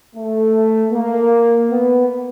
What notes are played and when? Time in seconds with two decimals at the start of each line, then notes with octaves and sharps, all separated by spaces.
0.16 A3
0.93 A#3
1.70 B3